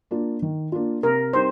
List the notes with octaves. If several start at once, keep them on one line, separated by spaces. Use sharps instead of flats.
A#3 D4 F4
D#3
A#3 D4 F4
C3 A#4
G3 C4 D#4 C5